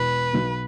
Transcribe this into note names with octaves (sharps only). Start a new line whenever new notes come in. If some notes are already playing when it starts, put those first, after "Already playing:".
Already playing: E1 E2 B2 B4
B1 B2 B3